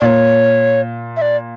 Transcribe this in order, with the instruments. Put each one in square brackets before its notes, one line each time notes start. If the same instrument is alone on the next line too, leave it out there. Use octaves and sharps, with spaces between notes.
[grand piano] A#2 [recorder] C#5 D5
[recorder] E5
D5